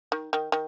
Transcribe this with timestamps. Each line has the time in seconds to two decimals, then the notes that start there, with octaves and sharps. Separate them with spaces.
0.12 D#3
0.33 D#3
0.52 D#3